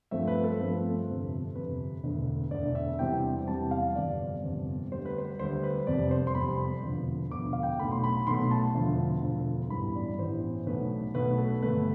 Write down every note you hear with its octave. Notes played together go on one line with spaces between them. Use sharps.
G2 F3 A3 C4 E5
B4
A4
G2 F3 A3 C4
A4
G1 F2 C3
G1 F2 C3 B4
E1 D2 D3
E1 D2 D3 D5
E5
E2 C3 G3 C4 G5
E2 C3 G3 C4 A5
F5
G1 F2 C3 G3 B3 D5
G1 F2 C3 G3 B3
D2 D3 G3 C5
B4
C5
D2 D3 G3 C5
B4
F1 F2 C3 G3 D5
C5
C6
F1 F2 C3 G3 B5
E1 D2 D3 F3 B3
E1 D2 D3 F3 B3 D6
F5
G5
B1 B2 A3 B5
C6
B5
B1 B2 A3 C6
A5
E1 D2 D3 F3
E1 D2 D3 F3
A1 G2 E3 G3 B3 B5
D5
A1 G2 E3 G3 B3 C5
B1 B2 A3 B4
B1 B2 A3 B4
A4
G1 G2 D3 A3 B4